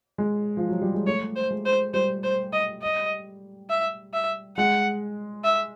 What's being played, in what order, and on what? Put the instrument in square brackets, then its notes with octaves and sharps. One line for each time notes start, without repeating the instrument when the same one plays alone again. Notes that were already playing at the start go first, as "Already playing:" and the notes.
[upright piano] G#3
F3
F#3
G3
G#3
[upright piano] A3 [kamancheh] C#5
[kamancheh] C5
[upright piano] G#3
[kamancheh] C5
[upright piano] G3 [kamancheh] C5
[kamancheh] C5
D#5
D#5
E5
E5
[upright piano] G#3 [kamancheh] F#5
[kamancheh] E5